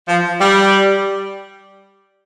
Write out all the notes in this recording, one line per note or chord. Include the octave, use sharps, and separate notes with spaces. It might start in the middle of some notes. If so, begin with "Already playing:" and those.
F3
G3